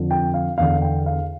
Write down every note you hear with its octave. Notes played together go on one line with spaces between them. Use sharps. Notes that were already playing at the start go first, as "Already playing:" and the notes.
Already playing: F2 D3
G5
F5
E2 D3 F5
G5
F5